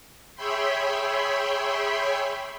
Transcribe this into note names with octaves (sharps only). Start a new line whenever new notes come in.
G#4 C#5 E5 G5 B5 C6